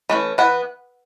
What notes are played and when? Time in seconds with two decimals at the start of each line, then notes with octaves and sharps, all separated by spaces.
0.10 E3 A3 C#4
0.38 E3 B3 F#5